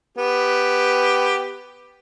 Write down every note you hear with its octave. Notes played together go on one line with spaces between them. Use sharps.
B3 G4